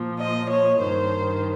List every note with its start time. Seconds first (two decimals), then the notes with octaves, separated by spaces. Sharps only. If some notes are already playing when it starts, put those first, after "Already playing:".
Already playing: A#2 F3
0.19 D#5
0.50 C#5
0.82 G2 D#3 C5